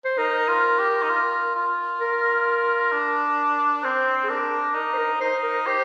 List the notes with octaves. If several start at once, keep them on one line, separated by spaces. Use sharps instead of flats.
C5
D#4 A#4
F4
G4
D#4
F4
F4
A#4
D4
C4 C5
G#4
D4 A#4
D#4 A#4
C5
A#4
D#4 C5
A#4
G4 C5